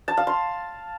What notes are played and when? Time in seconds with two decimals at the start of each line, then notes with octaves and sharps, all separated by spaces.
0.08 A5
0.17 F5
0.27 C6